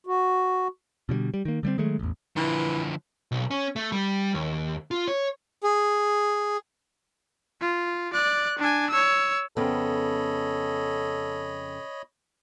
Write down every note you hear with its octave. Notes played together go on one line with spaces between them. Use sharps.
F#4
B2 D3 F3 G3
G3
D#3 A#3
D3 G3 A3 C4
D#3 F#3 G#3 A3
A1 E2
D3 E3 F3
B1
C#4
A3
G3
D#2
F4
C#5
G#4
F4
D5 F#6
D4 G#5
C#5 E6
F2 C#3 B3 A4 C#5 D#5 B5